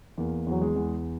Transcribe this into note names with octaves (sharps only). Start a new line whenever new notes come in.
E2 A#3
E2 F#3
G#3
E2